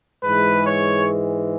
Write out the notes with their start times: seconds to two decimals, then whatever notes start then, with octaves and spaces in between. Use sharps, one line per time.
0.24 G#2 E3 G#3 B4
0.65 C#5